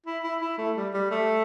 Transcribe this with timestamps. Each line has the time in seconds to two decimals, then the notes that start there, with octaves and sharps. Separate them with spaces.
0.06 E4
0.24 E4
0.41 E4
0.58 A3
0.76 G3
0.94 G3
1.11 A3